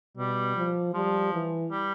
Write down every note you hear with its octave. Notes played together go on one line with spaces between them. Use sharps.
B2 G3
F3
F3 G3
E3
G3